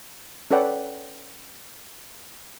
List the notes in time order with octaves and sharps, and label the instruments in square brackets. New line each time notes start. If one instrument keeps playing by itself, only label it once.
[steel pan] C#4 A4 B4 D5 F#5 G5